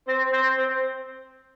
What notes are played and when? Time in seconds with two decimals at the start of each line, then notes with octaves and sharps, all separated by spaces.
0.08 C4 C5
0.32 C4 C5
0.57 C4 C5